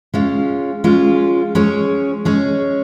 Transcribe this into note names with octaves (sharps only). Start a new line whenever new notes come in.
G#3 C#4 F4
G#3 C#4 F4
G#3 C#4 G#4 C#5
G#3 C#4 G#4 C#5